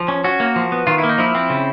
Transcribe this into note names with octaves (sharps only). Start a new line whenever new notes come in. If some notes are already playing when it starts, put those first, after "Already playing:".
Already playing: F3
C#4
C#4 F#4
A#3
F3
B3
D#3 F4
E4
A#3
D#4
F3 E4
C4
C#3